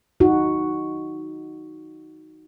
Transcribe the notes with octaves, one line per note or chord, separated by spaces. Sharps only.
D#4 F#4